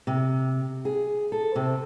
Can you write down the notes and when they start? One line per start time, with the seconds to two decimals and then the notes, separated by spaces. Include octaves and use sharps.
0.07 C3
0.85 G#4
1.32 A4
1.55 C3